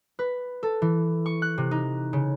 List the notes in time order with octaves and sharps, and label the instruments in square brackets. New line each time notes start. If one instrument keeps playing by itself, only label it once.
[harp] B4
A4
E3
C#6
F#6
C3
D#4
C#3